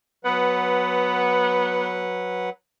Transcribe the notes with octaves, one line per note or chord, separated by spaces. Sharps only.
F#3 B3 B4 F#5